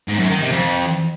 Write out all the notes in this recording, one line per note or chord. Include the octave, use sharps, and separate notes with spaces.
G#2
F#2
D#3
C3
F2